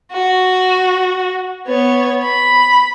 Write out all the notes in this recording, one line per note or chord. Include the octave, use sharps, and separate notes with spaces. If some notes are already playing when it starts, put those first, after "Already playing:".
F#4
B3 C#5
B5